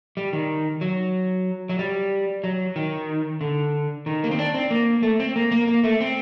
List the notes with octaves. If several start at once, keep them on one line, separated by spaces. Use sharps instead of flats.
G3
D#3
F#3
F#3
G3
F#3
D#3
D3
D#3
A#3
C4
D4
C4
A#3
A3
C4
A#3
A#3
A#3
A3
C4